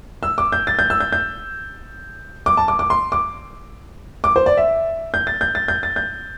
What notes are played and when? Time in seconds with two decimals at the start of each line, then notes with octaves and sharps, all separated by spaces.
0.23 E6
0.38 D6
0.52 G6
0.67 A6
0.79 G6
0.90 E6
1.00 G6
1.13 G6
2.46 D6
2.57 A5
2.68 D6
2.79 D6
2.90 C6
3.12 D6
4.24 D6
4.36 C5
4.46 D5
4.57 E5
5.14 G6
5.27 A6
5.41 G6
5.55 A6
5.68 G6
5.83 A6
5.96 G6